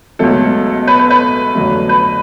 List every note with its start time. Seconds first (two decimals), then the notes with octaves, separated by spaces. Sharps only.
0.19 C#2 B2 F#3 A3 A4
0.87 B4
0.99 B4
1.10 B4
1.55 F2 D3 F#3 A3
1.89 B4